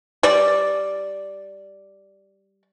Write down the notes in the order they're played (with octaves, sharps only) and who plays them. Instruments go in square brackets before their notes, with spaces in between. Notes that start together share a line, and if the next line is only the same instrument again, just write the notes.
[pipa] G3 D5